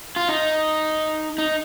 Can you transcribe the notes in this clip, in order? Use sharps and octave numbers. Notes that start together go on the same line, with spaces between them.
F4
D#4
D#4